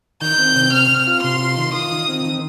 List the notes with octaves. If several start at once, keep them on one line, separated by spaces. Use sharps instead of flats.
D#3 G6
C4
C3
C4 F6
C4
F4
C3 C6
F4
D#3
F4 D#6
D#3
C4
D#3